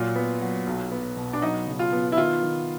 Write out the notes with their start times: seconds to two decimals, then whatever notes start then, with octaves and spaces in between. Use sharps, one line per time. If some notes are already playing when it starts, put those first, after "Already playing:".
Already playing: A#2 F#3 F4
0.16 B3
0.41 F#3
0.67 B1
0.91 B3
1.17 B2
1.33 D4
1.42 F#3 D#4
1.67 C#3
1.79 F4
1.93 B3
2.12 E4
2.17 D#3 F4
2.42 D#3